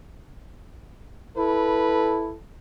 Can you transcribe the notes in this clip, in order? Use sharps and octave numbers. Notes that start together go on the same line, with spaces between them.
E4 A4 B4